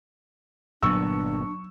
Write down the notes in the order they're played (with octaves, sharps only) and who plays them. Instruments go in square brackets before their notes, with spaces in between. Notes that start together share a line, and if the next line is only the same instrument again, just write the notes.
[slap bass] G1 A#2 B3 [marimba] F#3 [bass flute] D4 [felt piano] C#6 E6